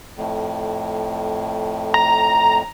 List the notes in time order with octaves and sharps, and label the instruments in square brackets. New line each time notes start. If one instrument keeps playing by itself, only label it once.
[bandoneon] F2 A2
[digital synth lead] A#5